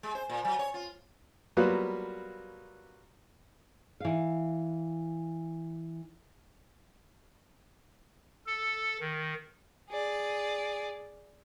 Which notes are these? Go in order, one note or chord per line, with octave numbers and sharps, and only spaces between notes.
G#3
C5
A#2
F#3
C#5
F4
F#3 G3 A#3 B3 F4 F#4
E3 F5
A4
D#3
G#4 D5